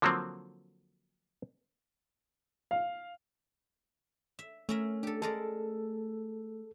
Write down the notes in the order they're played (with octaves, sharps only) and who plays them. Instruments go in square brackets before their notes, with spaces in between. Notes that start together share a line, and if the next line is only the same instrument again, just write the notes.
[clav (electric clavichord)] D3 F3 F#3 A#3 C4
[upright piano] F5
[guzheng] E5
[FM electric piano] A3 [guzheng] C#4 A#4 E5
[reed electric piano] D4 [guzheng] G4 A4
[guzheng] G#3 A#4 D5 [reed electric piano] A4